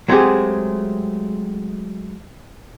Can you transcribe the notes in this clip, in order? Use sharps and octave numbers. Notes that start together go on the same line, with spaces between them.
F#3 G#3 A3 C4 G4 G#4